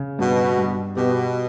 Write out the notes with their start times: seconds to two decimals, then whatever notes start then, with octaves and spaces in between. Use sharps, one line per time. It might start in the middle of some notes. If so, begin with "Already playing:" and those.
Already playing: C#3
0.19 G2 B2
0.59 G2
0.97 B2 G4